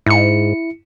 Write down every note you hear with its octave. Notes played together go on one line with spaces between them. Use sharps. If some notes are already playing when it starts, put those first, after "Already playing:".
G#2 E4 C#7